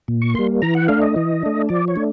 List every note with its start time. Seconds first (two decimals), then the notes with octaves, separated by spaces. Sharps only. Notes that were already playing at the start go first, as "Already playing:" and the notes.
0.08 A#2
0.22 C#6
0.34 G3 A#3 C6
0.62 E3 A#5
0.75 F#5
0.88 A3 D4 F5
1.02 D#5
1.16 E3
1.43 A3 D4
1.69 F3 D5
1.88 C#5
1.96 A3 D4